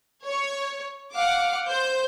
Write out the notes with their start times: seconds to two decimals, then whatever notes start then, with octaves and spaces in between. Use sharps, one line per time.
0.25 C#5
1.13 F5 F#5 D6
1.66 C5 G6